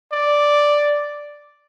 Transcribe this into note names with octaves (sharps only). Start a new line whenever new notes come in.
D5